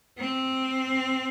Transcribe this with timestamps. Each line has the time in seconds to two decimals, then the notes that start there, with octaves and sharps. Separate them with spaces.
0.19 C4